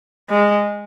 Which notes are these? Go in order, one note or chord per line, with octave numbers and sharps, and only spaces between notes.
G#3